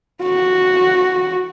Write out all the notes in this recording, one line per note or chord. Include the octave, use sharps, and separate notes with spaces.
F#4